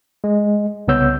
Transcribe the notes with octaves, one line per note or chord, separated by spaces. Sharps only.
G#3
C2 C#3 B3 C#5 E6 G6